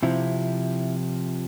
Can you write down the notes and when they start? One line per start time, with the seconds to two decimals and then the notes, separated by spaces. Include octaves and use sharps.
0.03 C3 F3 E4